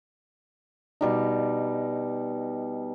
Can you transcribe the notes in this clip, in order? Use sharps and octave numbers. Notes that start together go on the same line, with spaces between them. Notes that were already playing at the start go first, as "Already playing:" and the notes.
B2 G3 D#4